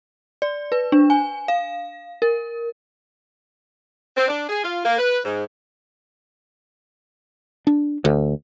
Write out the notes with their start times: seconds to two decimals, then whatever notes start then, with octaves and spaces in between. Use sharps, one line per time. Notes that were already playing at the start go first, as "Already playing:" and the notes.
0.42 D5
0.72 B4
0.92 D4
1.10 G#5
1.48 F5
2.22 A#4
4.17 C4
4.28 D4
4.49 G#4
4.64 F4
4.84 A#3
4.99 B4
5.24 G#2
7.67 D4
8.05 D2